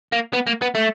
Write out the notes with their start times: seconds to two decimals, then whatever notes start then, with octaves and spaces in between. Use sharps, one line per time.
0.13 A#3
0.34 B3
0.47 A#3
0.62 B3
0.75 A3